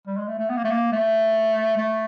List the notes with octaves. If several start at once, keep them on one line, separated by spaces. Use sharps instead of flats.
G3
G#3
A3
A3
B3
A#3
A3
A#3
A3
A3